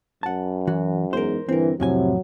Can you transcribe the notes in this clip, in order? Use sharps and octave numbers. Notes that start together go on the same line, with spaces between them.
F#2 F#5 A5
E3 F#4
E2 G#2 A#4 C5
G2 D3 E3 C4 A#4
F2 A2 C3 F#3 E4 G#5